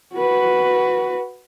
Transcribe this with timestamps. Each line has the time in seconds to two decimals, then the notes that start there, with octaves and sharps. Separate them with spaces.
0.14 F#4 B4